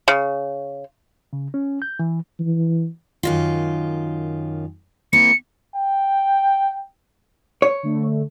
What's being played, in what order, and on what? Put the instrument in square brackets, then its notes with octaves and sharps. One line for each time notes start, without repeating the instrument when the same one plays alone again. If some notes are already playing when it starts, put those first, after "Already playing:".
[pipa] C#3
[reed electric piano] C#3
C#4
G6
E3
[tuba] E3
[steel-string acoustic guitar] F#2 D#3 F4
[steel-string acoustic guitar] A#3 C4 E4 [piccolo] C#7
[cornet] G5
[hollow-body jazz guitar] C#5
[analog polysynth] D3 A3